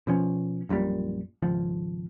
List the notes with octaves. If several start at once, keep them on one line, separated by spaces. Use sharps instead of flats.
B2 F3 C#4
A#1 F#2 A#2 G3
G#1 C#2 F3